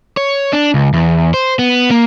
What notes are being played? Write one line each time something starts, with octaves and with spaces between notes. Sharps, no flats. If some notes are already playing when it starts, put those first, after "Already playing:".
C#5
D4
C#2
E2
C5
B3
A#3